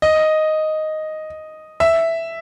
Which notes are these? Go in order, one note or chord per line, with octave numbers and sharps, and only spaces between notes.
D#5
E5